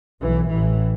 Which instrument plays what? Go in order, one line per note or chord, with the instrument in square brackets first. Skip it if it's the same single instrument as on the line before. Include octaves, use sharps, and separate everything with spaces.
[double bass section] B1 A2 E3
A1 A2 E3